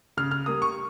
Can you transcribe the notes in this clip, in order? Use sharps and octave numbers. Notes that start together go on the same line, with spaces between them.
C#3 F6
F6
G3 A#3 D#6
C#6